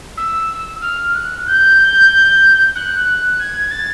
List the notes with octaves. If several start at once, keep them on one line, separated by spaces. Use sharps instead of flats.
E6
F6
F#6
G6
F#6
G#6
A6